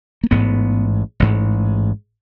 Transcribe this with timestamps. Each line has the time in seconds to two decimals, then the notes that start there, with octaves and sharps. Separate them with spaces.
0.23 A#3
0.31 A1 G#2 B3
1.20 A1 G#2